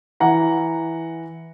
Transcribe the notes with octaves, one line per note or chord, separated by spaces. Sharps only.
E3 F#5 A#5